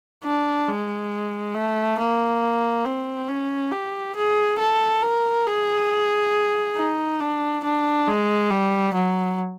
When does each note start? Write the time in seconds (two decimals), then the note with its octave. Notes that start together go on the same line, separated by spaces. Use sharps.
0.24 D4
0.68 G#3
1.54 A3
1.98 A#3
2.85 C4
3.29 C#4
3.72 G4
4.16 G#4
4.59 A4
5.02 A#4
5.46 G#4
6.76 D#4
7.20 D4
7.64 D4
8.07 G#3
8.50 G3
8.94 F#3